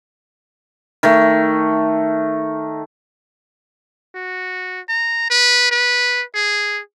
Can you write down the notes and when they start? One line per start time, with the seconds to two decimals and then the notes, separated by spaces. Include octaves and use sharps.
1.03 D#3 A3
4.15 F#4
4.89 A#5
5.30 B4
5.71 B4
6.35 G#4